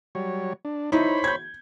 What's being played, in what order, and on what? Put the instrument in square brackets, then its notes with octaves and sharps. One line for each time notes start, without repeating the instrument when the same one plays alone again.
[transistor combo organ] F#3 G3 C#5
D4
[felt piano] D#4 E4 [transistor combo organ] C5 C#5 B5
[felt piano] G6 G#6